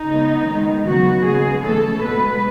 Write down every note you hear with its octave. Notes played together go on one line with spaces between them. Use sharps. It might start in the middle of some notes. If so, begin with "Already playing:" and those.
Already playing: D#4
C#3 G#3 B3
D#3 G#3 B3
C#3 F#3 B3 F#4
C#3 G#3 B3 G#4
C#3 E3 A3 A4
B2 G#3 B3 B4